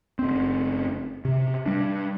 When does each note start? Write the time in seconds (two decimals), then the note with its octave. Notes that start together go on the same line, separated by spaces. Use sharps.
0.19 F#1 C4
1.25 C3
1.66 G3 D4